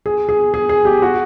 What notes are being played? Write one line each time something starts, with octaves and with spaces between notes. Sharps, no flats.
G#4
G#4
G#4
G#4
G4
F#4